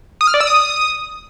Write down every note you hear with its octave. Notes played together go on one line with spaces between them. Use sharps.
D#6
F6
D5
E6
D#6